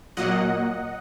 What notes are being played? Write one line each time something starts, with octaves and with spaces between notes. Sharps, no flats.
A#2 F#3 A#3 D#5 F#5